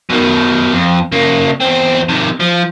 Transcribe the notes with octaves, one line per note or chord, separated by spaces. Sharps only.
B2 D#3
F2
C#3 A#3
E2 C4
C3 D#3
F3